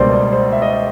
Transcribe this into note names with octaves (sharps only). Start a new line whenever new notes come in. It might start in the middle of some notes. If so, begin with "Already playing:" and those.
Already playing: C#2 B2 G3 A#3 D4 C5 D5
C5
E5
D#5